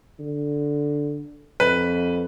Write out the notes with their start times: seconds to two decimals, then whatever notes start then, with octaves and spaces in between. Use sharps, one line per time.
0.19 D3
1.60 F2 B4